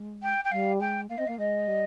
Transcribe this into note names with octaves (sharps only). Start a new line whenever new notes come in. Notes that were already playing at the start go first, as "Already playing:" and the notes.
Already playing: G#3
G5
G5
G3 F5
G#3 G5
A#3 F5
C4 D#5
A#3 F5
G#3 D#5
G3